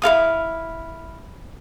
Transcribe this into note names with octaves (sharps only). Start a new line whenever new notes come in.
E4 A#4 F5 D#6